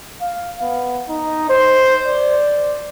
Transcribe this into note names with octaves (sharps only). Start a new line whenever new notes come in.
F5
B3
D#4
C5
D5